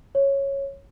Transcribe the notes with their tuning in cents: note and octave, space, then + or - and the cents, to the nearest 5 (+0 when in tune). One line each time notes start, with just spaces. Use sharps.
C#5 -10